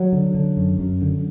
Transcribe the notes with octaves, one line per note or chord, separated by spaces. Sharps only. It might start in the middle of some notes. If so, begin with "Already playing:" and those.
Already playing: F#3
D3
D3
F#2
F#2
D3